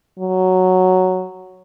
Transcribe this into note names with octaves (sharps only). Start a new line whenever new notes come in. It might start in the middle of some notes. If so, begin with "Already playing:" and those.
F#3